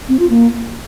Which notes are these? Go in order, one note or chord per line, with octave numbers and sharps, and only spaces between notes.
C4
F4
A#3